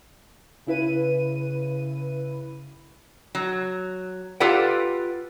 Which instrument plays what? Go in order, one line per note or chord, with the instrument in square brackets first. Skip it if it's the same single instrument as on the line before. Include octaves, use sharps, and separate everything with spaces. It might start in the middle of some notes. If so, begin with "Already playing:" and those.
[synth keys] C#3 E4 B4 D#7
[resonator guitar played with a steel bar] F#3
F4 G4 A4 B4 D5 F#5